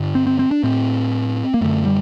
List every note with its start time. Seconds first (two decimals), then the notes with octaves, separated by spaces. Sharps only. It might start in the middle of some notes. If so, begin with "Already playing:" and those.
Already playing: G2 D3
0.15 C4
0.27 C4
0.39 C4
0.51 D4
0.63 A2 C4
1.54 A#3
1.61 F#2 D3 A3
1.86 G3